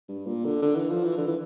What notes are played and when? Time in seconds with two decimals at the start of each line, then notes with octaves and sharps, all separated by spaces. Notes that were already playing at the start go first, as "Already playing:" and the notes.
0.08 G2
0.26 A#2
0.45 D3
0.62 D3
0.76 E3
0.90 F3
1.04 E3
1.18 D3
1.28 E3